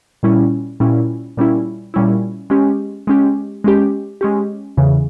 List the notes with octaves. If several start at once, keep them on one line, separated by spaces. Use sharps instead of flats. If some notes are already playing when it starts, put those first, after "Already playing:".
A#2 G3 C#4 E4
A#2 G3 C#4 E4
A#2 G3 C#4 E4
A#2 G3 C#4 E4
G#3 C#4 G4
G#3 C#4 G4
G#3 C#4 G4
G#3 C#4 G4
E2 C#3 E3